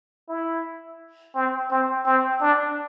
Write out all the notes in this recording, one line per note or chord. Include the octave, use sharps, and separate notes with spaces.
E4
C4
C4
C4
D4